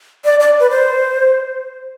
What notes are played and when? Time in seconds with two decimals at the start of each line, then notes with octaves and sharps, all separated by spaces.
0.25 D5
0.40 D5
0.59 B4
0.70 C5